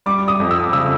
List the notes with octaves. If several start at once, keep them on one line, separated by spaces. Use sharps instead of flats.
G3 D6
D#6
F2
E6
C#3 E6